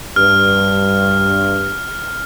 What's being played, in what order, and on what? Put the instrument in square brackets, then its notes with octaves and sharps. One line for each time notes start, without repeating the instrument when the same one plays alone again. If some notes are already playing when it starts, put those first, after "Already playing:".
[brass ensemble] G2 [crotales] F6